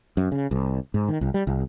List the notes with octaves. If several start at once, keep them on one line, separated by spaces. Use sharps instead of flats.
F#2
C#3
C2
G#2
D#3
C2
G3
C2